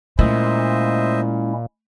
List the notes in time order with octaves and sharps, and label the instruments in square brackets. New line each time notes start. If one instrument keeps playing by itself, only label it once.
[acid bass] A#2 [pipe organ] G#3 C#4 E4 [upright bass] A3 [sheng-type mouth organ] C5 D#5 E5